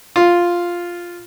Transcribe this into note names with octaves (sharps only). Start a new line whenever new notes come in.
F4